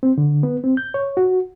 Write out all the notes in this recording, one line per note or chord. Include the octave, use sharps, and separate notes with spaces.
C4
D3
B3
C4
G6
C#5
F#4